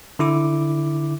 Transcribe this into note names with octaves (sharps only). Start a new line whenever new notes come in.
D3 E4 D6